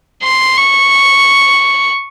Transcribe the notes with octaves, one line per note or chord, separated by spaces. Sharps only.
C6
C#6